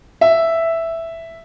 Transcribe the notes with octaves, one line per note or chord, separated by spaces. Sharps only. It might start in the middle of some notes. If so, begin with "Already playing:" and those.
E5